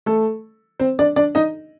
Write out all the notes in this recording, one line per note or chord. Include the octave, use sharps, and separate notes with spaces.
A3 A4
C4 C5
D4 D5
D4 D5
D#4 D#5